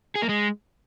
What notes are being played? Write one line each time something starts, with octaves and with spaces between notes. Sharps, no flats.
G#4
A#3
G#3